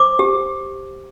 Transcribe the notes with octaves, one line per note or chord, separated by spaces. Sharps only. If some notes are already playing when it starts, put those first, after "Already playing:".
Already playing: C5 D6
G4